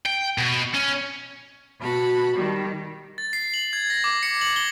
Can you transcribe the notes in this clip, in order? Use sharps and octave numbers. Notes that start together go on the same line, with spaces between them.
G5
B2
C#4
B2 F#4 A5 B5
D#3 G3
A6
C7
F#7
G#6
A#6
D6
C#7
F#7
G7